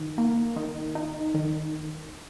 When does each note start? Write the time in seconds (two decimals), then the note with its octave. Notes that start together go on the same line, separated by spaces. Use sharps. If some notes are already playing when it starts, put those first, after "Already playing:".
Already playing: D#3
0.18 A#3
0.56 D#3
0.95 D#4
1.34 D#3